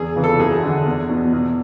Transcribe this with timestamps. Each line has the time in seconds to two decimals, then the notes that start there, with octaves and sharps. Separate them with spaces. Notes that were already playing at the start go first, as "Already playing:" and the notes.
Already playing: E2 G#4
0.16 C#3 E3
0.24 A4
0.39 F#2 G#4
0.63 D3
0.86 E2
1.09 B2
1.33 E2